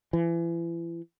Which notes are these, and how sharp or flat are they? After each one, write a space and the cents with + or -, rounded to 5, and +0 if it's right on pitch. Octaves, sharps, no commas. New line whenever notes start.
E3 +35